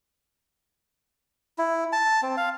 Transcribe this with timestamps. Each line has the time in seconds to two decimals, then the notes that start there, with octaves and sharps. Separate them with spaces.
1.58 E4
1.93 A5
2.22 C4
2.37 F5